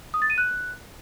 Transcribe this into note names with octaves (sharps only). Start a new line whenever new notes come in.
D#6
A6
D#7
F#6